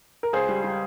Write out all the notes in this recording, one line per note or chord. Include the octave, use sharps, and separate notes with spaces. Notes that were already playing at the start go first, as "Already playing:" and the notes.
A#4
C#2 G#4 C5
G3
G3